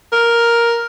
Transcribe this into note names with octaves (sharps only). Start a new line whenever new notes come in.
A#4